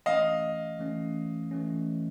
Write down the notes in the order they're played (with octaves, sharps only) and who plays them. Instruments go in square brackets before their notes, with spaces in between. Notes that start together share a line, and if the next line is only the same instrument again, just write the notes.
[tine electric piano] E3 A3 C#4 [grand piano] D#5 F5
[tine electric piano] E3 A3 C#4
E3 A3 C#4